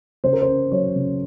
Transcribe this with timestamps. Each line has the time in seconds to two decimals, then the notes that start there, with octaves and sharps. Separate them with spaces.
0.24 C#3 C5
0.33 A#4
0.42 C5
0.48 C#4
0.72 F#3 C#5
0.96 C#3